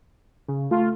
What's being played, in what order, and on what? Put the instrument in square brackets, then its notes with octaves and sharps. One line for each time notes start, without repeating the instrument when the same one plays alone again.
[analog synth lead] C#3
[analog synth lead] A3 [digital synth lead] F4